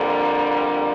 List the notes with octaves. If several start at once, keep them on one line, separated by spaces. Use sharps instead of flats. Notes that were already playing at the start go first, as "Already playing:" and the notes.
Already playing: F2 D3 G3 A#3